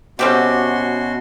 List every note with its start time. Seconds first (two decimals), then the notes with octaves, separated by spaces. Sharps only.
0.19 B2 G3 C4 C#4 F#4 G4 E5 C6